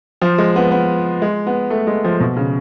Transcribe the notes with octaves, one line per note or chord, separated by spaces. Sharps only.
F3
G#3
B3
B3
G#3
B3
A3
G#3
F3
B2
C#3